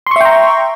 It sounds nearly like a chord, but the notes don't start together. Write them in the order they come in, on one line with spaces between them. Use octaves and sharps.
C6 C#6 E5 G5 A#5